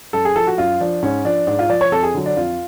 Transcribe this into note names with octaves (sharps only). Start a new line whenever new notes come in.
F#2 A4
G#4
F3 A4
F#4
F#2 F4
F3 D4
G#2 C#4
F3 D4
G#2 D4
F4
F3 D5
C#5
F2 A4
G#4
D3 F#3
D4
F2 F4